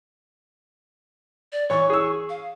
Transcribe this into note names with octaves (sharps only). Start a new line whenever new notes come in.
D5
E3 C#5 C#6
G#4 E6
F5